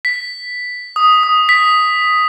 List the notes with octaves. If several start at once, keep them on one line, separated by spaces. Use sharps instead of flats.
B6
D#6
D#6
B6